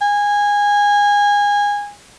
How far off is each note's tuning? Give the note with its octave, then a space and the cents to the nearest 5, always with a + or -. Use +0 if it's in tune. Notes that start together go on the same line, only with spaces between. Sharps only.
G#5 -20